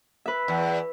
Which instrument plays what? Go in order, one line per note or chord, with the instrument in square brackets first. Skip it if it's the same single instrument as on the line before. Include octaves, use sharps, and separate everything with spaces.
[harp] B4 E5
[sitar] E2